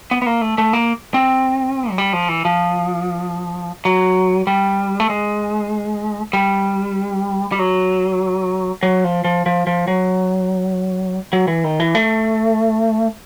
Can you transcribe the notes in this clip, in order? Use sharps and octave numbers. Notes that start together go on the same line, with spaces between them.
B3
B3
A#3
A3
A3
A#3
C4
F#3
G3
F3
E3
F3
F#3
G3
A3
G#3
G3
G3
F#3
F#3
F3
F3
F3
F3
F#3
F#3
E3
D#3
E3
A3